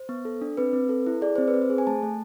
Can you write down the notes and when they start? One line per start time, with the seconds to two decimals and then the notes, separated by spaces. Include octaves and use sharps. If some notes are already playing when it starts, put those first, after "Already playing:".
Already playing: C5
0.09 B3
0.25 A4
0.41 D4
0.57 C4 B4
0.73 C4
0.89 A4
1.07 E4
1.21 G#4 D5
1.36 C4 C5
1.48 B4
1.54 C4
1.62 C5
1.70 G#4
1.78 G#5
1.87 A3 A5
2.03 A3